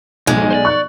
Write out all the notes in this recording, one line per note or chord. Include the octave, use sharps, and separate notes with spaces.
B1 F2 G#2 G#3
C5 D5
C#6 F#6